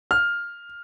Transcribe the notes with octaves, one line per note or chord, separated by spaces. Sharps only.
F6